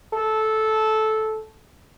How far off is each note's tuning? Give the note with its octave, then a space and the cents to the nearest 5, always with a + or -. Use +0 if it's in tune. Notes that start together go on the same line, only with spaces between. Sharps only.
A4 -10